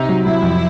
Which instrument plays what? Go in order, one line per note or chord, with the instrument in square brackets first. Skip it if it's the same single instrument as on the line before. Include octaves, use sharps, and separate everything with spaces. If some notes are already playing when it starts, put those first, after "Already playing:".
Already playing: [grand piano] C3 [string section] D#4
[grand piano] F#3
[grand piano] F#3 [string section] E4
[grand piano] F2